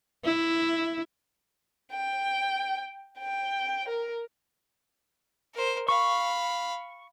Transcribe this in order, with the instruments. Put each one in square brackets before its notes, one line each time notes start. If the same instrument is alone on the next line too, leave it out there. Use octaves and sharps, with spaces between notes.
[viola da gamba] E4
[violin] G5
G5
A#4
[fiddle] A#4 C5
[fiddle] F5 B5 [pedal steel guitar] C#6